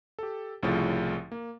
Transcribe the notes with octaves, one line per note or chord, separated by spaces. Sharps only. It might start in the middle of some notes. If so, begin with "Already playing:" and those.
G4 A4
C2 A2 C#3 F3 A6
A#3